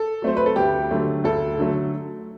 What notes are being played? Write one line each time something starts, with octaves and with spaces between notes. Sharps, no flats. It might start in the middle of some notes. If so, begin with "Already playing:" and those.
Already playing: A4
F#3 A3 C4 C5
B4
A4
D2 G4
D3 F#3 A3
D2 A4
D3 F#3 A3